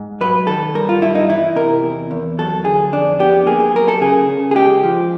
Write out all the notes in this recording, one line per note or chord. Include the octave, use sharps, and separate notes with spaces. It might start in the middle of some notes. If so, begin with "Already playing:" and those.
Already playing: G#2
F#3 B4
D#3 A4
G2 A#4
F4
G2 E4
D#4
E3 E4
C3 A#4
E2
E2
F#3 A4
D3 G#4
F2 D4
B3 G4
A#3 G#4
G#4
F#3 A#4
A4
C#3 G#4
C#3
G#4
G#3 G4
F3